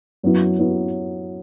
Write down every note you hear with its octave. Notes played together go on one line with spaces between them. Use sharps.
F#2 F#3 B3 E4
F#3 B3 E4